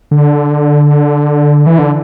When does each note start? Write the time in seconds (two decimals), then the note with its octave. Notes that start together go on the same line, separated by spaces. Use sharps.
0.11 D3
1.66 E3
1.78 D3